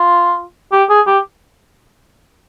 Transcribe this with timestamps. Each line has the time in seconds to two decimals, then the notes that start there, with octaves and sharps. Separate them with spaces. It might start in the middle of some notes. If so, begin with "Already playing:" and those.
Already playing: F4
0.72 G4
0.89 G#4
1.06 G4